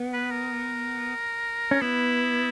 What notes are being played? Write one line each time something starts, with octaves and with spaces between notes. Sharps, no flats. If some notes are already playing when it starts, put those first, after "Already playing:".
Already playing: B3
B4
A#4
C#4
B3 E4